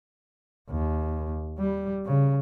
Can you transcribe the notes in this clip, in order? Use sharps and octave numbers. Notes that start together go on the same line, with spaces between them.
D#2
G3
C#3